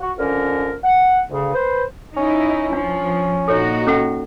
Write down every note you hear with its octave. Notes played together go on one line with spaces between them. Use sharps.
F#4
F2 D3 C#4 A#4
F#5
D2 C#3
B4 C5
C#4 D#4 E4
F3 D4
A#2 D#4 F#4 A4 C#5
C#4 A4 F#5